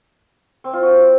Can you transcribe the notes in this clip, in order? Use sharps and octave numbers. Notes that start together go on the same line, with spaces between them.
C4
F4
F#4